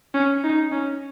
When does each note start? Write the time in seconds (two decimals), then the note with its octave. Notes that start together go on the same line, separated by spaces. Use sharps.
0.14 C#4
0.44 D#4
0.72 C#4